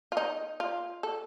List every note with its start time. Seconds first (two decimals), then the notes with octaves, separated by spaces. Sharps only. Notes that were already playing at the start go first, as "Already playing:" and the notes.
0.12 F4
0.17 D#4
0.60 F4
1.03 A4